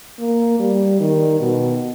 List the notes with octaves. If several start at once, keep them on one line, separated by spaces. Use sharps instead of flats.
A#3
G3
D#3
B2